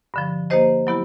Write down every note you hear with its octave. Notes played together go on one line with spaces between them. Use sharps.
G2 D3 F3
A#3 D#4 G4 C5 D#5
F#3 B3 E4 G4